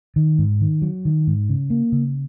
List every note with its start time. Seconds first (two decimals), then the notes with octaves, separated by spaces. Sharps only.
0.16 D#3
0.39 G#2
0.61 D#3
0.82 F#3
1.05 D#3
1.27 G#2
1.49 C#3
1.70 A#3
1.92 C#3